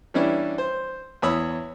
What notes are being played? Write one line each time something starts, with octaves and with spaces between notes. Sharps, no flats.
E3 G3 C#4 D4 E4
C5
E2 E4 C#5 B5 D#6 E6